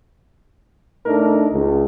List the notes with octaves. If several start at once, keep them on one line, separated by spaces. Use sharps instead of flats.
A2 A3 D4 D#4 A#4
C#2